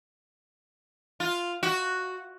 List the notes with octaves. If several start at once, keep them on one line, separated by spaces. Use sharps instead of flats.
F4
F#4